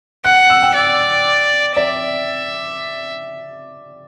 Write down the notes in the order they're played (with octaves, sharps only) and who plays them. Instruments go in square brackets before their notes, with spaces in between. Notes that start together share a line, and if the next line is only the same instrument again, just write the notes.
[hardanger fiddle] F#5 [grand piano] F#6
[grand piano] E6
G5
[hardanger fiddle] D5
[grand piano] D5 [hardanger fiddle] E5